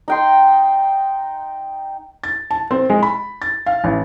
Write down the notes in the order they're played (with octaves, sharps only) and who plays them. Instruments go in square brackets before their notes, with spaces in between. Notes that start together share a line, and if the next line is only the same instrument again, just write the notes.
[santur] D#4 G5 C6
[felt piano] A6
A5
C4
G#3
B5
A6
F5
A1